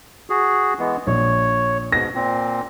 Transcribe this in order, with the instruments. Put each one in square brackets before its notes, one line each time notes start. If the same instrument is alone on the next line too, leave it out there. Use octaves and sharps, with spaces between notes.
[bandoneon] F#4 G#4
E3 G#3 B3
[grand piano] A#1 [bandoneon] C#5
[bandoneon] G#2 B2 [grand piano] A#6
[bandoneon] A#2 C4